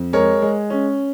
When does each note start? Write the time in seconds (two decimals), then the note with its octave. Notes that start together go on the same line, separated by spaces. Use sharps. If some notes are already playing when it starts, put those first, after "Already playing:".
Already playing: F2
0.13 G#3 A#4 C#5
0.42 G#3
0.70 C#4